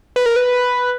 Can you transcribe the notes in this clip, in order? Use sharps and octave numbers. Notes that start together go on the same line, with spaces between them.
B4
A#4
B4